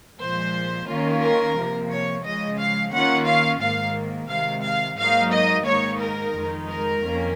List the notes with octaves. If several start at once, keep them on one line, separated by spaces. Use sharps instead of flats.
A#2 F3 G#3 C5
D#3 A#3 C#4 F4
A#4
C3 F3 A#3
C#5
C#3 F3 G#3 D#5
F5
D#3 A#3 C#4 F4 F#5
F5
G#2 D#3 A#3 F5
C3 D#3 G#3 F5
F5
G#2 F#3 A#3 D#4 F5
D#5
G#2 D#3 A#3 D#4 C#5
A#4
F2 D#3 G#3 D#4
A#4
F2 D#3 A#3 C#4